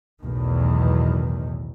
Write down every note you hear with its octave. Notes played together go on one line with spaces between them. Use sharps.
B1 E2 A2 D#3